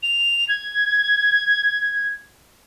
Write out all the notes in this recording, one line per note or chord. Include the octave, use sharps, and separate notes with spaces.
F7
G#6